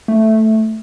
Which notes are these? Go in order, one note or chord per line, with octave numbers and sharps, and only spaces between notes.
A3